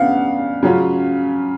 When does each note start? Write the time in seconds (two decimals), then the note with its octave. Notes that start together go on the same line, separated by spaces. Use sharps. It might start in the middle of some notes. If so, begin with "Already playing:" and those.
Already playing: C#3 B3 D4 F5 F#5
0.63 C#3 F#3 C#4 F4